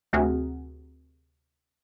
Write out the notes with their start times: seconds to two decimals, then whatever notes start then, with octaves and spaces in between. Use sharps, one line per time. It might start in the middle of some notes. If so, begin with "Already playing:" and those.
0.13 D2 C3 F#4 G#4 A#4